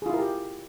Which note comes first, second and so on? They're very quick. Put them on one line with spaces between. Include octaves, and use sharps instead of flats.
G#4 F4 E4 A#4 G4